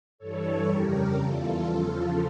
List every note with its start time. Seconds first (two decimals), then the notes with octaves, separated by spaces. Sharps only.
0.18 G2 E3 G3 A4 C#5
0.66 F2 C#3 G3 G4 A#4
1.14 E2 E3 G3 F4 A4
1.62 E2 C#3 F3